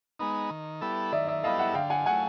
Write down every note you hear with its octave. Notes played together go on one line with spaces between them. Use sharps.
G#3 B3 D#4
D#3
G3 B3 E4 A4
D#3 D5 E5
D5 E5
G3 B3 E4 A4 D#5 F5
E5 F#5
D3 F5 G5
F#5 G#5
F#3 A3 F#5 G#5